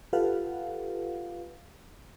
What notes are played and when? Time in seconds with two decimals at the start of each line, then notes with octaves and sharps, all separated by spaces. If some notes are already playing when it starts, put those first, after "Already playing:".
0.13 F4 G4 A4 B4 F5 F#5